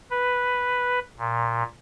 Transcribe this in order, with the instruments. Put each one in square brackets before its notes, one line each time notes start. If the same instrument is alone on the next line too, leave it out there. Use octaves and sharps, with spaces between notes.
[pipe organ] B4
A#2